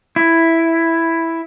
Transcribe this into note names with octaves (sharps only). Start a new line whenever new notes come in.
E4